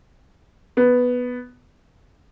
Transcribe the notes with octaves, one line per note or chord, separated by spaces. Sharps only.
B3